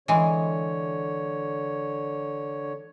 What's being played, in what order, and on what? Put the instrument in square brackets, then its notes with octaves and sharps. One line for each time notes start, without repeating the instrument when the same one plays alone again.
[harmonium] D3 C#5 [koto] E3 G#3